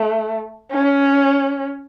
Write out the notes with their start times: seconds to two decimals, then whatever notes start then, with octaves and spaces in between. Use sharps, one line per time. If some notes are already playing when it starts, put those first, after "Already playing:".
Already playing: A3
0.72 C#4